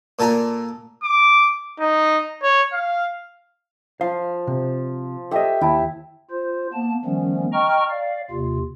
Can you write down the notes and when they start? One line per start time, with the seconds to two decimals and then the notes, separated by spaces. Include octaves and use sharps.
0.19 A#2 A4 G#5 A#5
1.03 D6
1.80 D#4
2.43 C#5
2.73 F5
4.01 F3 F5
4.47 C3
5.31 G4 A4 D#5 E5
5.61 D#2 E4 G5 A5
6.31 F4 C5
6.73 A#3 B3 A5
7.05 D#3 F3 G3 A3 B3 C#4
7.53 D#5 G5 A#5 C#6 F6
7.90 D5 F5
8.31 D#2 C3 F4